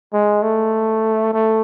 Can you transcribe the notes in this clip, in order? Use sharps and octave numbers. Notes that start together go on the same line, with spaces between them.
G#3
A3
A3